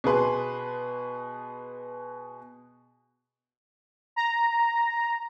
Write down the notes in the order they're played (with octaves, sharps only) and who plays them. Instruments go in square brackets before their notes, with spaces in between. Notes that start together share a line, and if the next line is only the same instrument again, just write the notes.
[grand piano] B2 G#4 B4 C6
[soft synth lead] A#5